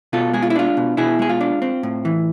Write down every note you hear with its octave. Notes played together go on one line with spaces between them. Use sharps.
B2 F4 A4
G#3 G#4
F4
E4
D4 F4
B2
B2 E4 G#4
G#3 G#4
F4
D4
C4
A2
E3